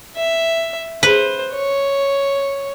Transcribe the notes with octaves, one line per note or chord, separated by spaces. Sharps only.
E5
B4 C5
C#5